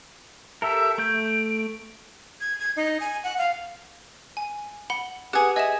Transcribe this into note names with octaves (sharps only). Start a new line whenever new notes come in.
G4 A4 A#4 E5
A3 G6 D7
G#6
G#6
D#4
G#5
F#5
F5
G#5
F#5 B5 G7
G4 G#4 B4 F#5
G#4 D#5 E5 E7